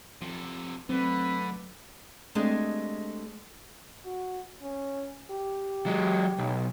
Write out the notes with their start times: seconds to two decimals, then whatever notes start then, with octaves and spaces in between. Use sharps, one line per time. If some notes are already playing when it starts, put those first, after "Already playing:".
0.21 C3 F3 A4
0.89 D3 F#3 A3 C4 B4
2.35 G#3 A3 C4 D4 G4 G#4
4.05 F#4
4.62 C#4
5.31 G4
5.86 F#3 G#3
6.39 B1